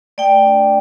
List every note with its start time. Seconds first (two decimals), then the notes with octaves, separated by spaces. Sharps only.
0.18 A3 D5 G5
0.45 D4